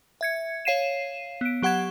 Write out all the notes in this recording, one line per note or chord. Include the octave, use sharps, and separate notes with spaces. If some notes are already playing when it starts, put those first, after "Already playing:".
E5 G#6 C#7
C#5 F5 C7 D#7 E7
B3 D7
F#3 G4 F#5 C#6 G#6 E7